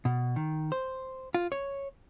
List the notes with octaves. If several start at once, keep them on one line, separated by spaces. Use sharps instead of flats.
B2
D#3
C5
F4
C#5